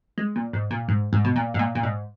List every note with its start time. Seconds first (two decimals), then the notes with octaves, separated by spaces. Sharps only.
0.18 G#3
0.36 A#2
0.53 G#2
0.71 A#2
0.88 G#2
1.13 G#2
1.25 B2
1.36 A#2
1.54 G#2
1.59 A#2
1.75 A#2
1.83 G#2